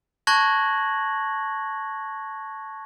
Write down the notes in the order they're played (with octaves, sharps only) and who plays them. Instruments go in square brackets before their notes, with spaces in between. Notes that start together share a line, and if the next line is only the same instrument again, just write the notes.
[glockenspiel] A5 C#6 F#6 G#6 A#6 F#7